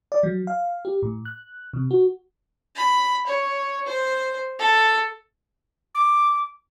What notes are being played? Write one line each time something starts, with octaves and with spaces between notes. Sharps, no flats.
D5
F#3
F5
G4
A2
F#6
C3
F#4
B5
C#5
C5
A4
D6